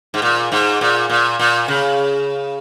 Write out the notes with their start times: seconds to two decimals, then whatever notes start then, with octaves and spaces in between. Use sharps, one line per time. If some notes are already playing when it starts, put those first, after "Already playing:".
0.14 G#2
0.22 A#2
0.52 G#2
0.81 A#2
1.10 A#2
1.39 A#2
1.68 C#3